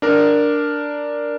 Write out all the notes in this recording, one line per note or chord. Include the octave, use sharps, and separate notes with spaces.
D4 A#4